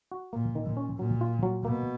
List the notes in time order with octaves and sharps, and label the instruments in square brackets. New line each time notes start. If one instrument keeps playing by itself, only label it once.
[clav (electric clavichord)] F#4
[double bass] A#2 [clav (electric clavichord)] A#3
[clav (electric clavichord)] D#3
[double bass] A#2
[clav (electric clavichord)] C#4
[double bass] A#2 [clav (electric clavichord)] F#3
[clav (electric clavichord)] F4
F#3
[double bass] B2 [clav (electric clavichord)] A#3